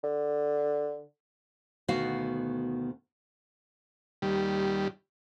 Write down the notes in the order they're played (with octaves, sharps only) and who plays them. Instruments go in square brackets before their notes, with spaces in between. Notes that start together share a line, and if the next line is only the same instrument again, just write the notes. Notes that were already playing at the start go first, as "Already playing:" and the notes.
[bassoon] D3
[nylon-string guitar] D2 B2 D#3 B3 F#4 F5
[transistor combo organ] D#2 G3